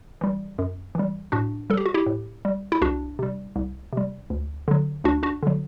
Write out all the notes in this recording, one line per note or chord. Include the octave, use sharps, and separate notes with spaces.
E3 G3
F#2
E3 G3
A2 D4 F#4
G3 A4
G4
F#4
E4 G4
A2
G3
E4
C2 D4 F#4
C3 G3
C2
C3 G3
D2
D3 F#3
D2 D4 F#4
D4 F#4
D3 F#3